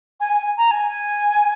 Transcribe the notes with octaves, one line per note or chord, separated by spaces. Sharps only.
G#5
G#5
A#5
G#5